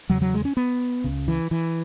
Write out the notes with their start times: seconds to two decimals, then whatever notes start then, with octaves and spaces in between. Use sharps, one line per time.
0.10 E2 C#3 F#3
0.22 F#3
0.34 G#3
0.45 C#4
0.57 B3
1.04 C#2 C#3
1.28 E3
1.51 E3